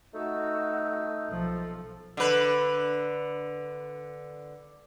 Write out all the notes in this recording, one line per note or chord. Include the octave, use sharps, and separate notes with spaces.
A3 D#4 F#4 E6
B1 F3 A4
D3 B4